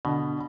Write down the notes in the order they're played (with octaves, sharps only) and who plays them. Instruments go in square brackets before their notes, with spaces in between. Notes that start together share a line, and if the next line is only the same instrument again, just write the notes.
[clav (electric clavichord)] B2 [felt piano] D3